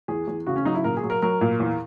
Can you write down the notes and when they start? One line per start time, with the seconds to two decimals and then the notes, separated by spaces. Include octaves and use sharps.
0.08 E2 G#4
0.28 E2
0.47 C#3 F#4
0.56 C#4
0.65 F#3 D#4
0.75 E4
0.84 A#2 A#4
0.97 G#4
1.03 F#3
1.10 A#4
1.22 F#3 A#4
1.41 A#2
1.60 E2